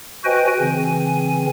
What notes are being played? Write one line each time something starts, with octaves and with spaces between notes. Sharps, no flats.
F#4 B4 C5 D#5 G5 G#5
C#3 E3 C4 G#5